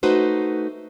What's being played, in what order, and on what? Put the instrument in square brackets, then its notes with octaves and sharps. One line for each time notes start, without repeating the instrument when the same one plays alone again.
[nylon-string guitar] A3 D#4 F#4 B4 C5